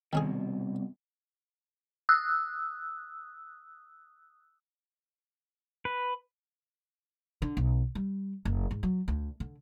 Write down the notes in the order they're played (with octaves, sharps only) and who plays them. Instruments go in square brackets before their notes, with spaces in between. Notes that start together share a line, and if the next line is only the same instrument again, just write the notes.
[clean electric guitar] C2 B2 [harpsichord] D#3 C#4 G#4
[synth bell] D#6 E6 F#6
[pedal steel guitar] B4
[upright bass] D3
B1
G3
F#1
G#2
F#3
D2
D3